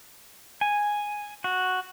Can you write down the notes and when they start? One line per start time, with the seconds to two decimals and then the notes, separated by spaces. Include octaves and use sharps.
0.61 G#5
1.44 F#4